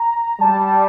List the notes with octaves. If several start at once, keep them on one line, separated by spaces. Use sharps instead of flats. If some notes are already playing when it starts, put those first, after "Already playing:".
Already playing: A#5
G3 A5